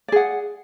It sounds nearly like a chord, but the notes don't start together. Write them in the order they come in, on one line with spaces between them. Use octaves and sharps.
D5 G#4 F#5